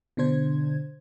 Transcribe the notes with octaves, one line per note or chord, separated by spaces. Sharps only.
B2 D3 D4 C5 G#6